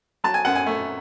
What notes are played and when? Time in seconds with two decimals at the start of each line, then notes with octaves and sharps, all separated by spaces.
0.24 F#3 A5
0.34 G#5
0.45 F#2 F#5
0.55 G#5
0.66 A3